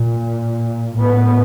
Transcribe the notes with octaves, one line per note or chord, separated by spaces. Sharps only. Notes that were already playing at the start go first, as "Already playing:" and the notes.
Already playing: A#2
A2 B3